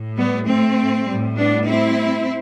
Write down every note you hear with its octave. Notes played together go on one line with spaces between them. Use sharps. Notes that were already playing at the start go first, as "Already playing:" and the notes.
Already playing: A2
G3 B3
A3 C4
A2 G3
B3 D4
C4 E4